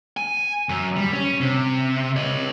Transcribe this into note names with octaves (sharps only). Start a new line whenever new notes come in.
G#5
F#2
G3
C#4
C3
C#5 D#5